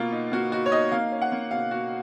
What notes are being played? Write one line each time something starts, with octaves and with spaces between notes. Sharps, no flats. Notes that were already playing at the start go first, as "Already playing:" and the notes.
Already playing: B2 A#3 F4
D#4
A#3 F#4
D#4 F#4
C#5
D#4 D#5
A#3 F5
C#4
F#5
A#3
B2 F5
B2 F#4